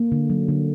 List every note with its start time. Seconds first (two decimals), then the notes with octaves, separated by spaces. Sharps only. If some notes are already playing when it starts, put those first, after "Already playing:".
Already playing: A#3
0.12 D3
0.30 F#3
0.49 D3